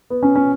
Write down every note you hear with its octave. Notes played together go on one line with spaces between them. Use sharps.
B3
C#4
C#4